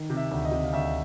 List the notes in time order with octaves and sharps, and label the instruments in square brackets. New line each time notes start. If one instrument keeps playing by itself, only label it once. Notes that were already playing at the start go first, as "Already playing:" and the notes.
Already playing: [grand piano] D#3
C3
E5
D2
D#5
C3
F5
D2 E5